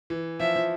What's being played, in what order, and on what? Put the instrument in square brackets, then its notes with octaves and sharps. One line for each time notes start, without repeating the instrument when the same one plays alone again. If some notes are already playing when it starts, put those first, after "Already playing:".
[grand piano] E3
[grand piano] F3 [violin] E5
[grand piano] F3